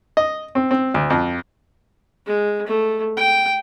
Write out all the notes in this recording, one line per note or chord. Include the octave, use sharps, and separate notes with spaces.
D#5
C4
C4
D2
F2
G#3
A3
G5